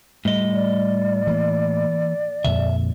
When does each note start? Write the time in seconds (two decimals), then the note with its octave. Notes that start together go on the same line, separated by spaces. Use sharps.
0.25 A2 G3 A3 D#5
0.53 D5
1.27 E3 A#3
2.45 F2 A#2 D3 E5